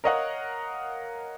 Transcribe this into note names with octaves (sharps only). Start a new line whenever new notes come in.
A#4 C#5 D#5 F5 F#5